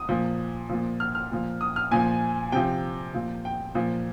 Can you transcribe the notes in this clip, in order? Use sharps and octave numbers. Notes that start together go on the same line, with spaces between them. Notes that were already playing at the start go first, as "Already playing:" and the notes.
Already playing: D#6
A#2 F3
A#2 F3
F6
F6
A#2 F3
D#6
F6
A#2 F3 G#5
C3 F3 G5
A#2 F3
G5
A#2 F3